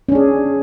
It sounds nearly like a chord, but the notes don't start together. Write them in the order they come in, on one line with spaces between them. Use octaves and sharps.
C#4 D4 G#4